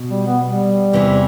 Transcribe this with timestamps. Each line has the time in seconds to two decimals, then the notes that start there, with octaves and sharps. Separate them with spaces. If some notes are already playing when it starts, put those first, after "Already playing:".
Already playing: B2
0.10 G3
0.26 B3
0.44 G3
0.93 E2 C3 E3